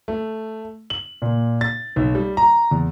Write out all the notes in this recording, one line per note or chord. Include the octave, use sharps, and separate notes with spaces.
A3
F#7
A#2
A6
B1
G3
A#5
E2